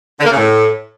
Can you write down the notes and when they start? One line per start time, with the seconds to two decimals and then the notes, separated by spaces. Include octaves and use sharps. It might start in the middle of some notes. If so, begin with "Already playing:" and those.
0.19 D3
0.25 A#3
0.31 C#3
0.37 A2